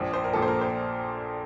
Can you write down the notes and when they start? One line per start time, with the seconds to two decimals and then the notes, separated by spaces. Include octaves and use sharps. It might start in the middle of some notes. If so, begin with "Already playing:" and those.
Already playing: A#1 A#2 F3
0.13 C5
0.24 A#4
0.33 A#1 A#2 F3 A4
0.42 C5
0.48 A#4
0.61 C5